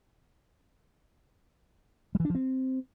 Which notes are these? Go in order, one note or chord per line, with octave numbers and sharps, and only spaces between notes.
G3
E3
D4
F3
C4